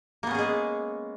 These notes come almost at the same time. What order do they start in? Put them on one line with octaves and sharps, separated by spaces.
A#3 B3 C#4 G#4 G#3